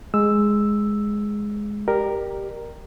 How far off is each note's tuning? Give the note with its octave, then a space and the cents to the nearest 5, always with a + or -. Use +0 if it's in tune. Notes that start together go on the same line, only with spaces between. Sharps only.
G#3 +0 E6 +0
G4 +0 A#4 +0 D5 +30